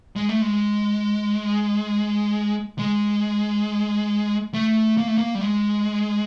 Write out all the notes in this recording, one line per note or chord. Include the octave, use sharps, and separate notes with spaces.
G#3
A3
G#3
G#3
A3
A#3
A3
A#3
G3
G#3